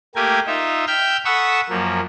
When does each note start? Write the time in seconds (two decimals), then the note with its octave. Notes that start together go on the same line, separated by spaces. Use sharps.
0.15 A3 A#3 G4 A#4 G#5
0.47 D#4 F4 E5
0.87 E5 G5 E6 F6 G6
1.25 A4 F#5 B5 C#6 D#6 E6
1.69 F#2 F3 A#3